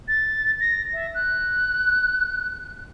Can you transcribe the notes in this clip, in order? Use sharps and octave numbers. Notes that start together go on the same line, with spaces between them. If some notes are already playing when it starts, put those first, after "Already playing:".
A6
A#6
E5
F#6